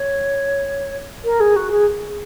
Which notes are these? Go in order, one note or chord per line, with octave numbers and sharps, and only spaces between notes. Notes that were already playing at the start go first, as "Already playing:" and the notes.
Already playing: C#5
A#4
G#4
F#4
G#4